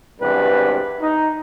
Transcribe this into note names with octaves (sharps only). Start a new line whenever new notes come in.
G#1 E2 G2 C3 B4
D#4